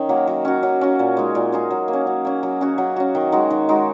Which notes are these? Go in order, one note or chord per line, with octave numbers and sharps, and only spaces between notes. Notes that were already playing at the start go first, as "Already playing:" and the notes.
Already playing: D#3 C#4
F#3 A#3
F#3
C#4 F#4
F#3
C#4 F#4
A#2
G#3 D#4 G#4
A#2
G#3 D#4 G#4
F#3
A#3
C#4
F#3
A#3 C#4
F#3
C#4 F#4
F#3
C#4 F#4
D#3
G#3 D#4 F#4
D#3
G#3 D#4 F#4